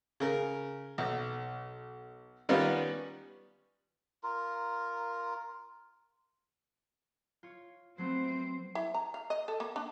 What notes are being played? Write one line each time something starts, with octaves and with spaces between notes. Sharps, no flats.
C#3 A#4
B1
D#3 G3 B3 C#4 F4
F4 A#4
F4 C#5
F#3 A3 B3 C4 C5
E4
A#5
F5
D#5
A4
A#3
D4